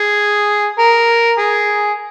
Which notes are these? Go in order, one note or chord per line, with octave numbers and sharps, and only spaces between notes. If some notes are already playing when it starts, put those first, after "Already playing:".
Already playing: G#4
A#4
G#4